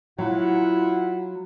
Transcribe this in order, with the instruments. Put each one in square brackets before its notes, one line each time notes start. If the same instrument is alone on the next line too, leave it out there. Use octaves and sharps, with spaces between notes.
[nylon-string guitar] F#3 [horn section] E4 F4 F#5